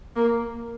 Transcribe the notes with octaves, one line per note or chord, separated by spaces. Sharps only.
A#3